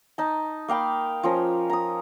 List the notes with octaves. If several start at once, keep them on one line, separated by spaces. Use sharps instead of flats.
D#4 A5
A#3 F5 G5 B5
F3 C#4 A#4
A#5 D#6